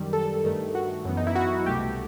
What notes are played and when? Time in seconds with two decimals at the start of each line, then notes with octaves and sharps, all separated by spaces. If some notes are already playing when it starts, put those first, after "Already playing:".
Already playing: F#2 D#3 G3
0.13 A4
0.44 G2 D#3 A3
0.75 F#4
1.05 F#2 E3 B3
1.17 D#4
1.27 E4
1.35 F#4
1.66 C2 B2 A3 G4